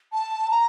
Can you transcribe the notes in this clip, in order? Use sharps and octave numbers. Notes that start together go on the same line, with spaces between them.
A5
A#5